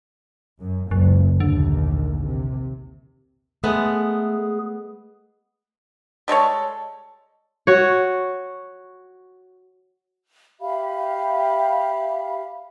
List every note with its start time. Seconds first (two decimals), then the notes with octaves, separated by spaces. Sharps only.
0.60 F#2
0.91 F#1 C#2 F#2 A#2
1.40 A#1 D#2 A2 D3
2.27 C3
3.64 G#3 A3 B3 G#4
6.28 G3 G#3 A4 C#5
7.67 F#4 C#5
10.60 G4 E5 F5 B5